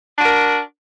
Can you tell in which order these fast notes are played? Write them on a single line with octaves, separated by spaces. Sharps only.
D4 F#4 A#4